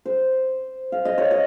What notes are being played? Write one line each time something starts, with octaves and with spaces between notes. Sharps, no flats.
C5
F5
D#5
C#5
D#5